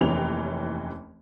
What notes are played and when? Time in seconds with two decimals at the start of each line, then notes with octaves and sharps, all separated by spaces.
0.01 F1 D#2 E3 C#4 G5 F7